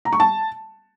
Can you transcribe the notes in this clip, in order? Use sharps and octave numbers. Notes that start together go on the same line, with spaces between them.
A#5
C#6
A5